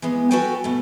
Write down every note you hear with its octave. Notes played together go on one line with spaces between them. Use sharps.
E3 G#3 B3
F#4 A4 B4 C#5 G5 G#5
B2 A3